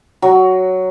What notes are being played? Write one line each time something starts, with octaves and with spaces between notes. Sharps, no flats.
F#3